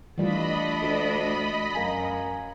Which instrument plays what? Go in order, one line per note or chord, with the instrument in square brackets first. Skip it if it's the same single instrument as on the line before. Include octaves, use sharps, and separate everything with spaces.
[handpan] E3 G3 F4 [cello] A3 D4 [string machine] D#5 B5
[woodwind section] D2
[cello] F#2 [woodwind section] A#4 F5 G#5